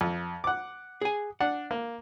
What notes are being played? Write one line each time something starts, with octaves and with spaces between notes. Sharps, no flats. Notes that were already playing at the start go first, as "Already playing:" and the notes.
F2
F#5 D6
G#4 G#5
D4 F#5
A#3